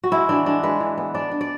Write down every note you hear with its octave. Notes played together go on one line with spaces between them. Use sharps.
F#4
G#3 E4
E3 D4
G#3 D4
G#3 B4
E3
B3
D4 D5
D4
D5